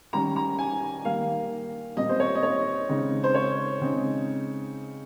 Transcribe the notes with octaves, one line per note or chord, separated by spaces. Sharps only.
D#3 G3 C#4 A#5
A#5
G#5
D#3 G3 A#3 F5
A#2 G3 C4 D#5
C5
C#5
D#5
C#5
C#3 G#3 C4 D#4
C5
C#5
C#3 G#3 C4 D#4